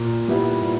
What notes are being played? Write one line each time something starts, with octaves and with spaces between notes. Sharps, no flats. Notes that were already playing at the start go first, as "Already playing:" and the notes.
Already playing: A#2
G3 B3 E4
A#2